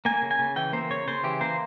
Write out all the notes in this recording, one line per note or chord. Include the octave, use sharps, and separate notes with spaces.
A#3 G#5
C#3
G#5
C#3
E3 G5
A#3 C5
C#3 C#5
C#3 C5
E3 G4
A#3 C5